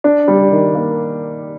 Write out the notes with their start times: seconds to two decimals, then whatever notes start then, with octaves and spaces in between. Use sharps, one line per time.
0.04 D4
0.28 G3
0.51 D#3
0.75 A#3